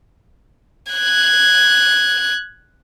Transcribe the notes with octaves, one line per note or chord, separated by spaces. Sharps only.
F#6 G#6